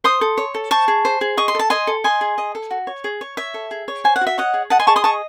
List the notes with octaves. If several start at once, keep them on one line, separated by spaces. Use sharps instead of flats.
C5 C6 D#6
A4
C#5
A4
C5 A5 C#6
G#4
C5
G#4
D#5 C#6
C6
A4 A5
D#5 G#5 C6
A4
D#5 G#5 C6
G#4
D#5
A4
F#4
C#5
G#4
C#5
C#5 E5
A4
G#4
C#5
C5 G#5
F#5
F#4
E5
C#5 D#5 F#5
G#4
D#5 F#5 A5
G#5 C6
G#4 A5 C#6
C6 D#6
D#5 A5 C#6